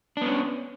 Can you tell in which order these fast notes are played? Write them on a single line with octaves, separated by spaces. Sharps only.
D4 B3 C#4